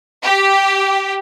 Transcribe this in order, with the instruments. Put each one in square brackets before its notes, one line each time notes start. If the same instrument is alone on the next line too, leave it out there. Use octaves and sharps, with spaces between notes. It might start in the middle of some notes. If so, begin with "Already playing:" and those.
[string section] G4